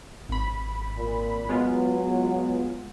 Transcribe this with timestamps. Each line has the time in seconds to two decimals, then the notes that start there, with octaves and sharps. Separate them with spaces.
0.29 G#1 B5
0.98 A#2
1.49 F#3 G#3 B3 F4